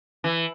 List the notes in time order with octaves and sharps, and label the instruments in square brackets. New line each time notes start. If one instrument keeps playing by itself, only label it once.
[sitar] E3